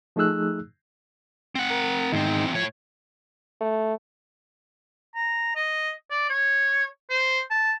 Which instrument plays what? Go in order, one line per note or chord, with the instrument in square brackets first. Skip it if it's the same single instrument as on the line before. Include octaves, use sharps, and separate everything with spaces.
[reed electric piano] F3 A3 D#4 G#4 E6 F#6
[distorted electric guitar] C4 F#5
[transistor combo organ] A#4
[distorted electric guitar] E2 C4 [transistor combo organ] G#2 D#3 D#4
[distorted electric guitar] A2 C#5 [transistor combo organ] F3
[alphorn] A3
[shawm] A#5
D#5
D5
C#5
C5
A5